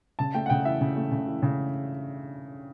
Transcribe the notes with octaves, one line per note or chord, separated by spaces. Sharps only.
C#3 A5
A3 G5
F#5
C#3 G5
E3 E5
C#3
A3
C#3
E3
C#3